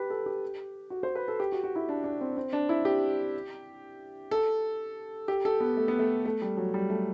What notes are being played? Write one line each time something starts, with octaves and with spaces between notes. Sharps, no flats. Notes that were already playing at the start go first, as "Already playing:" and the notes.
Already playing: G4 B4
A4
G4
F#4
C5
B4
A4
G4
F#4
F#4
E4
D4
D4
C4
C4
D4
E4
G4
A4
G4
A4
B3
A3
B3
A3
A3
G3
F#3
G3
A3